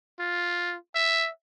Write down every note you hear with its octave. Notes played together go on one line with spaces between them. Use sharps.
F4
E5